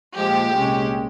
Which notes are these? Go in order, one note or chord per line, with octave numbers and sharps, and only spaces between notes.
A#2 F3 G#3 G4
C2 A#2 G#3 C#4